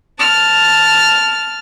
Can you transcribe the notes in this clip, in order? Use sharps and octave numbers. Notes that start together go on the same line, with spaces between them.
A5 F6